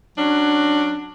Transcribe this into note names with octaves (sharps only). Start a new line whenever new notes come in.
F#3 C#4 D4